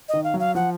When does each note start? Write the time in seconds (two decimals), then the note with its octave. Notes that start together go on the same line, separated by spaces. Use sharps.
0.09 D#3 D#5
0.24 F5
0.34 F#3
0.40 F5
0.55 F3 F#5